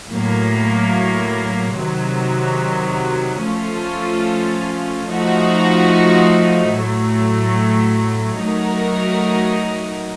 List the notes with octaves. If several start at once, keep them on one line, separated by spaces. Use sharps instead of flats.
A2 F#3 A#3
C3 D#3 F#3
F3 A3 C#4 F4 A4
F3 A3 D#4 F#4
A2 F#3 A3
F#3 A3 D#4 F#4 A#4